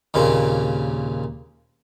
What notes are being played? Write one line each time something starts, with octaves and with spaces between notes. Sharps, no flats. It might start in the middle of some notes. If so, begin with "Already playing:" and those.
D#2 A#2 C#3 C4